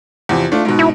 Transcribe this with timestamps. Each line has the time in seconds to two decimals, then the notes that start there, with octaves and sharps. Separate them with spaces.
0.29 E2 C3 F3
0.52 A3 D4 F4
0.65 G#2 B2
0.79 E4